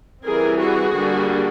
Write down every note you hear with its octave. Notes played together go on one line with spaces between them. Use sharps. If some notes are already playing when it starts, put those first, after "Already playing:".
E3 G3 C4 G#4 A#4
F#4 G#4
D3 G3 A#3 D4